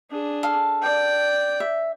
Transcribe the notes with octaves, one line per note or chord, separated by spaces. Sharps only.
D4 G#4
A4 F5
D5 G5
E5